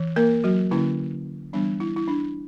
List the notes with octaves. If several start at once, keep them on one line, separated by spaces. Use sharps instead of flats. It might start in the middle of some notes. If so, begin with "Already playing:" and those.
Already playing: E3
A#3 A#4
F#3 F#4
D3 A#3 C#4 E4
E3 G3 B3 D4
E4
E4
D4